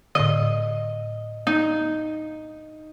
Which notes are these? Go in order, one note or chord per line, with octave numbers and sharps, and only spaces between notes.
A2 D3 D#5
D#4